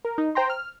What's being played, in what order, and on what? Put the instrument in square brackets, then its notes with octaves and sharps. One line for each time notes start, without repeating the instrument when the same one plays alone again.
[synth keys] A#4
D#4
C5 G5 A#5 C6
F6